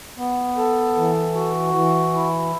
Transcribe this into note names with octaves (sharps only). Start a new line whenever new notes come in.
B3
A4
E3
F#4
E3
E4